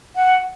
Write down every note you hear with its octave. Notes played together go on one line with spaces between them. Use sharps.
F#5